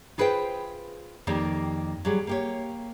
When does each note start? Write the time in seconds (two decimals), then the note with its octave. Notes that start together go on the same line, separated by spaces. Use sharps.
0.18 F4 G#4 B4 C5 D5 G5
1.27 F2 D#3 A#3 G4 D5
2.05 F#3 G3 G#4
2.27 A#3 G4 C#5